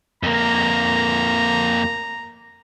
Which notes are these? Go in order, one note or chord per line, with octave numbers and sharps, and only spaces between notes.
F2 A#3 A#5